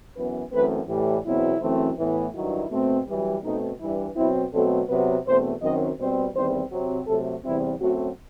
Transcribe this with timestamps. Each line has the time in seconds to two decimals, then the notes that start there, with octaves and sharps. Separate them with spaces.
0.16 F#2 E3 B3 B4
0.52 F#2 E3 A3 C4 B4
0.88 A2 E3 G3
1.25 E2 B2 F#3 C4 E4
1.61 F#2 E3 A3 C4
1.98 A2 E3 B3
2.34 G2 D#3 F#3 E4
2.70 B2 A3 C4
3.07 F#2 E3 G3
3.43 B2 A3 C4 D#4
3.79 G2 E3 G3 E4
4.16 B2 F#3 C4 E4
4.52 B2 F#3 A3 C4 A4
4.89 C3 F#3 B3 B4
5.25 E2 B2 A3 C4 C5
5.61 F#2 D#3 F#3 C4 D#5
5.98 B2 G3 C4 C5
6.34 E2 D#3 G3 C4 C5
6.71 C3 F#3 C4
7.07 C3 F#3 A3 A4
7.44 E2 C3 E3 G3 C4 E4
7.80 F#2 F#3 A3 C4 F#4